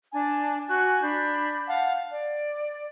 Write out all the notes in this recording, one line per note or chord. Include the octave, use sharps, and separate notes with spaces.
D4 G#5 A5
F#4 G#5 C#6 F#6
D4 B5 G6
F5 F#5 A5
D5